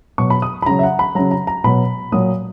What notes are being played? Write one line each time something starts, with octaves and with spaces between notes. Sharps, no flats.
B2 F#3 C#6
B5
D#6
B5
C#3 F#3 A#5
E5
F#5
B5
C#3 F#3 A#5
A#5
A#5
B2 F#3 B5
A#2 F#3 D#6